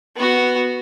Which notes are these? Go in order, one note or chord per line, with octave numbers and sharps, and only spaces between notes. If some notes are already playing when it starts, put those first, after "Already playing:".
B3 F#4